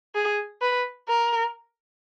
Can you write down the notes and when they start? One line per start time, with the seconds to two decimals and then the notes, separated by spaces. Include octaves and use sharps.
0.15 G#4
0.61 B4
1.08 A#4